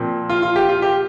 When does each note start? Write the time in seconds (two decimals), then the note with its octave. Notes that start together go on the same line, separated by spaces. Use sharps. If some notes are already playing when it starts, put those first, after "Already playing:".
Already playing: A#2 F3 C4
0.29 F4
0.42 F4
0.56 G4
0.69 F4
0.82 G4